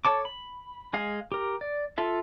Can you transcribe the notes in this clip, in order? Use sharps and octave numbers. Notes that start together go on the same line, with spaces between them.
A4 C#5 A5 D6
B5
G#3 G#4 F5
G4 A#4
D5
F4 A4 E5